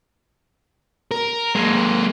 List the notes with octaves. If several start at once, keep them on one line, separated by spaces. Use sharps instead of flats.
A#4
G#3 A#3